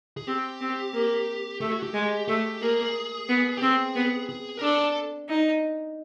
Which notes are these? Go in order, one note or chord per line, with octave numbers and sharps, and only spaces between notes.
G#4
C4 G4
C4
A#3
A3 G4
F#4
G4
G#3
A3 G4
A#3 G#4
B3
G4
C4 G#4
B3
G#4
A#4
D4 A4
D#4